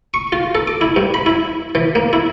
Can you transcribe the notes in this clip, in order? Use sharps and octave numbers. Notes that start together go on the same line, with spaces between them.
C#6
F4
A4
D6
E4
G2
B5
E4
E3
A#3
E4